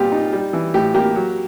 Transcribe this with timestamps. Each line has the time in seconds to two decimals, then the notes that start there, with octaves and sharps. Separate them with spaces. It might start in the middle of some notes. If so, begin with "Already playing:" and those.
Already playing: A#2 G3 B3 F4 G4
0.12 D#4
0.33 G3
0.53 E3
0.74 A2 G4
0.94 A#3 G4
1.15 F#3